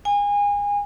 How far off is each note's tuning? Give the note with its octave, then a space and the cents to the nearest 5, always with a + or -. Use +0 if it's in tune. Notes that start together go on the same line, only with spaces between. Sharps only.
G#5 -30